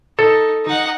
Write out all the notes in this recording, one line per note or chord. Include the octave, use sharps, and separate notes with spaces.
D#4 A4
D#4 F#5